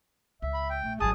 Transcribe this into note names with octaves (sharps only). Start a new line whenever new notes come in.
C#2 E5
B5
G5
A#1 A3
G#1 F#3 G#4 A5 D#6